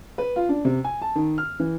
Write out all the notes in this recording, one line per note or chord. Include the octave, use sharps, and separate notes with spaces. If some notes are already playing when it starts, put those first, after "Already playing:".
B4
F4
D4
C3
G#5
A5
D#3
F6
E3